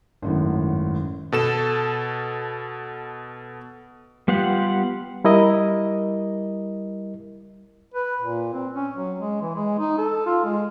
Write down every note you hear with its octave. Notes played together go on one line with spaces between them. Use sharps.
G#1 F#2 A2
B2 A4 E7
G3 B3 F4 G4 F#5
G3 E4 A#4 D#5
B4
A#2
C4
C#4
F#3
G#3
E3
G#3
D#4
A4
F4
G#3